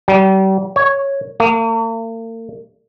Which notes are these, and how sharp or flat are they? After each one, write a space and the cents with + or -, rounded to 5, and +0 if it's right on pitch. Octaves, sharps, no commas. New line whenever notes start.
G3 -35
C#5 -5
A#3 -45